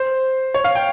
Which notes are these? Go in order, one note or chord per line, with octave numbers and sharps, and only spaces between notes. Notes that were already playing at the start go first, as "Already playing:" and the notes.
Already playing: C5
C#5
F5
G5